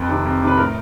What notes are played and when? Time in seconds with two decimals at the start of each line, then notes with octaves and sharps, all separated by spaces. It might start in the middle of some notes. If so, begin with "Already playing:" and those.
Already playing: F2 B4
0.09 C3 D#3
0.25 F2
0.41 C3 D#3
0.47 B4
0.57 A2 A#4